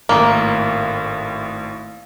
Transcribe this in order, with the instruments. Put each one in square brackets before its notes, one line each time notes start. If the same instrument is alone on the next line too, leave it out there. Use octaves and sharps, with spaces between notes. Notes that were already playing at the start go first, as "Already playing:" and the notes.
[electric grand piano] G#1 A2 [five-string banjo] A#3